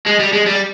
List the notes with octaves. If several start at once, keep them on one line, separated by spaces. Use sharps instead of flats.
G#3
G3
G#3
G3